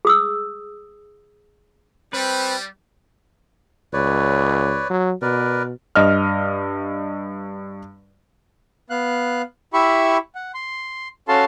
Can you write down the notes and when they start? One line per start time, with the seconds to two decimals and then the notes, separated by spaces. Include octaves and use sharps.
0.05 G#4 D#6 E6
2.13 G3 C4 B4
3.93 C#2 B4 C#5 D5
4.90 F#3
5.22 B2 A#4 B4 D5
5.95 G2 D#5 F6
8.90 B3 F5 F#6
9.74 E4 G4 E5 B5 C#6
10.35 F#5
10.54 C6
11.28 C#4 F#4 A4 F5 A5 C6